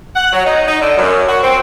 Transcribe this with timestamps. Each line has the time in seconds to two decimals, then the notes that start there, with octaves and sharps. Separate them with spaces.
0.16 F#5
0.33 F#3
0.46 D#4
0.68 D#4
0.82 D3
0.98 F#2
1.28 F#4
1.43 C4